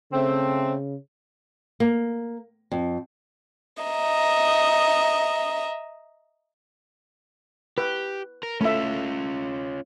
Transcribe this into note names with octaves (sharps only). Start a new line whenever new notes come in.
C#3 A3 C4
A#3
F2
D#5 E5 A#5
G4 B4
A#4
A3 C#4 F4 E5